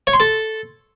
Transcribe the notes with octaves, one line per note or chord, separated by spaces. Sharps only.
C#5
C6
A4